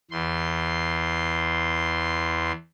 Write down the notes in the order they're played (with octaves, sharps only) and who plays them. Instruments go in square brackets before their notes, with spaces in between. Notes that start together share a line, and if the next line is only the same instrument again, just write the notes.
[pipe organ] E2 C6